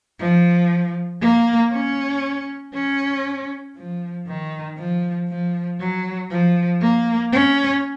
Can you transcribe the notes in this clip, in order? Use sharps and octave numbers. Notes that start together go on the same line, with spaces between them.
F3
A#3
C#4
C#4
F3
D#3
F3
F3
F#3
F3
A#3
C#4